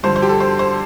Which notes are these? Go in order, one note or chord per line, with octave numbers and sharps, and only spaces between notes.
G2 D3 F3 C5
C5
G4
A4
C5
C5